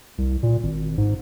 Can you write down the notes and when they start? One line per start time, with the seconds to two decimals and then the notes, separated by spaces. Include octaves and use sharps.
0.18 C2
0.43 A#2
0.63 G#1
0.97 G#2